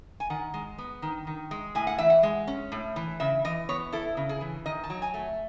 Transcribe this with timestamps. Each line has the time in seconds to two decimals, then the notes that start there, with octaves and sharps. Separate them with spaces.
0.20 G#5
0.30 D#3 F#5
0.54 G#3
0.78 B3
1.02 D#3
1.27 D#3
1.51 G#3
1.75 A2 G#5
1.87 F#5
1.98 E3 E5
2.10 F#5
2.23 G#3
2.47 C#4
2.72 A2
2.96 E3
3.20 C#3 E5
3.45 E3 D#5
3.69 B3 C#5
3.92 E4 A4
4.17 C#3
4.29 G#4
4.41 E3
4.66 D#3 D#5
4.84 A5
4.90 F#3
5.02 G#5
5.14 A3